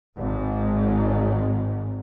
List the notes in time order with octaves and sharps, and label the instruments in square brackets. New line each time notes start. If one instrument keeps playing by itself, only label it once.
[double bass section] G#1 G#2